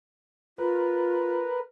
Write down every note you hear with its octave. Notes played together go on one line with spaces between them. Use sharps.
F4 A#4 B4